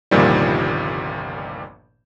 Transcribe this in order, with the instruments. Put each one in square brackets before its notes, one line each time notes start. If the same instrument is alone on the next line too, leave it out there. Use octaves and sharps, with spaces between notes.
[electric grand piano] G1 C2 A#2 D#3 F3 G3